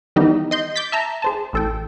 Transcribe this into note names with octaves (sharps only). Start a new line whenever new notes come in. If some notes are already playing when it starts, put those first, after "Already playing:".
D#3 E3 G3 B3 D#4 G4
D#5 C6 G6
D6 G6 A6 B6
E5 A5 A#5
G#4 C5 A5
A1 A4 G5